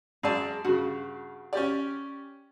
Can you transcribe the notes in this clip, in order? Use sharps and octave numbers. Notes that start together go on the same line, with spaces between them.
F#2 G#3 G#4 D5 A5
G2 C#3 F#4
C#4 G4 D5